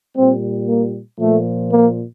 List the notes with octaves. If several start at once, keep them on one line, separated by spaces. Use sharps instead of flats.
A#2 G3 C4
A#3
A#2 F3 A3
A#3